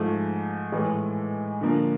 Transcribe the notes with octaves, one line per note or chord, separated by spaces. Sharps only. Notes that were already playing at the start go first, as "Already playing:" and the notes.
Already playing: G#2 F3 A3
A2 E3 G#3
D3 F3 A#3